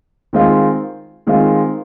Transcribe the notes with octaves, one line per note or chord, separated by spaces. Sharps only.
D#3 G#3 C4 F4
D#3 G#3 C4 F4